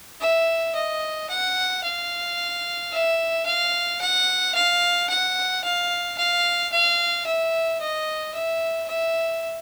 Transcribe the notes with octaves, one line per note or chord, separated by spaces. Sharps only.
E5
D#5
F#5
F5
E5
F5
F#5
F5
F#5
F5
F5
F5
E5
D#5
E5
E5